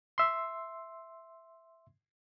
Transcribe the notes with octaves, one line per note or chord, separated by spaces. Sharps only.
E5 C6